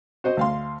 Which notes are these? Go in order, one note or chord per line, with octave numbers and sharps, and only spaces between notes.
F#4 C5 D#5
D2 F5 C6